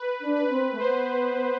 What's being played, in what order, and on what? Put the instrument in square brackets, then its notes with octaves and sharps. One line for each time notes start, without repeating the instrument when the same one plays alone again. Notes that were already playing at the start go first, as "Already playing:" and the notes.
Already playing: [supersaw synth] B4
[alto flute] D4
[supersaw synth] B4
[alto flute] C4
A3
[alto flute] B3 [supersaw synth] C5